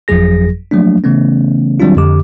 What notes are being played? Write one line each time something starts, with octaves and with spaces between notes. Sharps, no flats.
G1 F2 F3 F#3 G#4 A#6
F3 F#3 A3 A#3 D4
C#3 E3 A3 B3 C#4
D#3 F#3 G3 C4 D4 F4
F2 D3 G4 D6